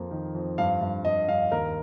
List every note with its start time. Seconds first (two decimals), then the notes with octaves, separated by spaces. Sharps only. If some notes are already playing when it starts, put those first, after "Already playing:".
Already playing: F2 A#3
0.11 D#3
0.34 F2
0.58 G2 F5
0.81 G2
1.05 G2 D#5
1.28 G2 F5
1.52 D#2 A#4